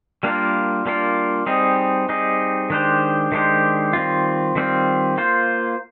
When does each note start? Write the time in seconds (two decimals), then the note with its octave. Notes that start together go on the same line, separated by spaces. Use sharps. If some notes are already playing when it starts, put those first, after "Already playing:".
0.23 G3 A#3 D4 F4 A#4
0.86 G3 A#3 D4 F4 A#4
1.46 G3 C4 D#4 G#4
2.09 G3 C4 D#4 G#4
2.70 D#3 G#3 D4 G4 C5
3.32 D#3 G#3 D4 G4 C5
3.93 D#3 G3 C4 F4
4.55 D#3 G3 C4 F4
5.18 A#3 F4 C5